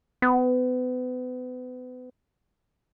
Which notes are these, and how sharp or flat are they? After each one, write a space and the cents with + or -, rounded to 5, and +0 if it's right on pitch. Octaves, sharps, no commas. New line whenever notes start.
B3 +35